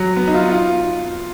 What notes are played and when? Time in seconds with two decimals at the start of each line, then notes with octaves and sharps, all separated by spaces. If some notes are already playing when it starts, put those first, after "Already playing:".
Already playing: F#3
0.16 B3
0.27 D#4
0.34 F4
0.40 D#4
0.51 F4